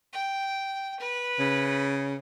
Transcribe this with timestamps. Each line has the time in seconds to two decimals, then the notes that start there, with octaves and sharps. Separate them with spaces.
0.13 G5
1.00 B4
1.39 C#3